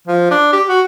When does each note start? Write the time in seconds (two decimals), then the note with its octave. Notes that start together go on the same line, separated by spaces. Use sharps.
0.08 F3
0.31 D4
0.53 G4
0.69 F#4